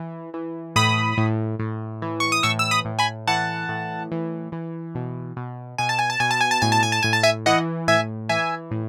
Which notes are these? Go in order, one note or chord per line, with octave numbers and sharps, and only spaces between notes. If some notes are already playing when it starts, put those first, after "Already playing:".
Already playing: E3
E3
A2 B5 D#6
A2
A2
E3
C#6
D#6
A2 C#6 E6
E6
B5 D#6
A2
G#5 B5
E3 F#5 A5
A2
E3
E3
B2
B2
B2 G#5
A5
G#5
A5
B2 G#5
A5
G#5
A5
A2 G#5
A5
G#5
A5
A2 G#5
A5
E5 G#5
E3 D#5 F#5
A2 E5 G#5
E3 E5 G#5
A2